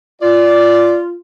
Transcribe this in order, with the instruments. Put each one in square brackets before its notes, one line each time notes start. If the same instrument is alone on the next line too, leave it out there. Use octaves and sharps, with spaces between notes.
[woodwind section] F4 [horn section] D5